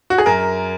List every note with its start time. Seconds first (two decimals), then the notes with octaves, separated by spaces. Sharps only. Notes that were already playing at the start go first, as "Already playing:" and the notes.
0.10 F#4
0.18 G#4
0.26 F#2 A#4